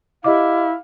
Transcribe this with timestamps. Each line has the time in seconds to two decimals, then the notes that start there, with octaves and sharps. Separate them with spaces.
0.24 E4 G4 D#5 F5 D6